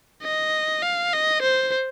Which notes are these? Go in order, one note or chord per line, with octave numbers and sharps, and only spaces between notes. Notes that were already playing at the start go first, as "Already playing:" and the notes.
D#5
F5
D#5
C5